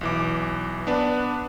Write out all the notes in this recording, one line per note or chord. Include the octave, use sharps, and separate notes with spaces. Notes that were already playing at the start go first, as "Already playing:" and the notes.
B1 E3 D6
B3 D4 B4